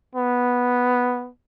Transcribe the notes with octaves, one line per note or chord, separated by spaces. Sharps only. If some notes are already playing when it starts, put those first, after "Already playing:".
B3